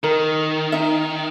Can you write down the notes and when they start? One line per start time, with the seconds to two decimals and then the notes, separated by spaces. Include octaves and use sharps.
0.03 D#3 A#4
0.72 D#4 E5